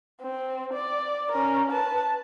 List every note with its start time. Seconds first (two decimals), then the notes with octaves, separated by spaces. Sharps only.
0.22 C4
0.73 D5
1.32 C#4 A#4
1.71 B4 A5